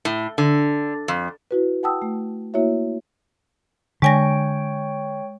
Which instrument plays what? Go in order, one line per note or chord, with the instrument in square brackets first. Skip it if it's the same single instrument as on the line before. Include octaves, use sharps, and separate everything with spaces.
[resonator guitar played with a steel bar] A2
D3
F2
[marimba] E4 F#4 B4
F#5 G5 A5 D#6 E6
A3
A#3 E4 F#4 C#5 E5
[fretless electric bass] D3 [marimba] G#3 G#5 A#6 [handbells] C#5 G5 C#6